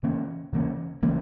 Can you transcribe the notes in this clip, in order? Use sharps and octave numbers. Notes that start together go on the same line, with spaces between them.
C#3 E3 A#3 C#4
C#3 E3 A#3 C#4
C#3 E3 A#3 C#4